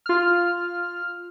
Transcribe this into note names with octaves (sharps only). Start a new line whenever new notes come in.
F4 F6